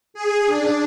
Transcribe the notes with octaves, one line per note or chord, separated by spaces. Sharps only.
G#4
D4